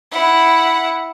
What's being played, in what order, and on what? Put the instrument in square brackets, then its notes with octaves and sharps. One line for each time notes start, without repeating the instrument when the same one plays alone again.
[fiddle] E4 F#5